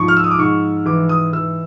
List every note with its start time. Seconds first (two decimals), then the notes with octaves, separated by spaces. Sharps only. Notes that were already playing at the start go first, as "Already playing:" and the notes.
Already playing: G#2 F3 C#6
0.08 F6
0.17 E6
0.24 D#6
0.31 D6
0.38 G#2 C#6
0.85 E3 D6
1.09 D#6
1.33 E3 E6